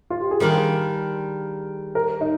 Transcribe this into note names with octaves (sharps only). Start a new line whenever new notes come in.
F4
G4
G#4
D#3 G3 D4 F4 A#4
A#4
D#4